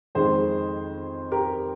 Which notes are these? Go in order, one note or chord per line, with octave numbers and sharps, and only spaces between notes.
F2 D#3 G#3 G#4 C5
G4 A#4